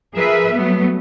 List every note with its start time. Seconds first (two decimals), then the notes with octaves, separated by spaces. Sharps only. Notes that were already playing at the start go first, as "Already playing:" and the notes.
0.14 F3 G#4 A#4 B4 E5
0.51 F#3 G3 A3 B3